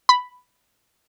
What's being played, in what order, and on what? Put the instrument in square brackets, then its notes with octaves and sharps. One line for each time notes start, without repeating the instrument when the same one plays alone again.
[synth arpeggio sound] B5